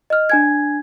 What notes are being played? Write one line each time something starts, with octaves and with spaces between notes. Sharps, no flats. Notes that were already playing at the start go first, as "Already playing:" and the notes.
D#5 F6
D4 G#5 G#6